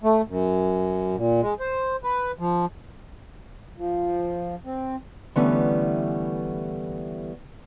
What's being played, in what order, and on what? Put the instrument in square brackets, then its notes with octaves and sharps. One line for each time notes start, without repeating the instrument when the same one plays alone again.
[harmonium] A3
F#2
A#2
G#3
C5
B4
F3
F3
C4
[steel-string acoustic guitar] D3 E3 G3 A3 B3 C#4